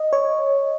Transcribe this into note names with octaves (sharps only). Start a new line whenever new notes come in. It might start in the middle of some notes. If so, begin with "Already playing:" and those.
Already playing: D#5
C#5